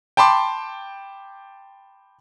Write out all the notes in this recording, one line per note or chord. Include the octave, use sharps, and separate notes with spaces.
G5 A5 B5 C6 D6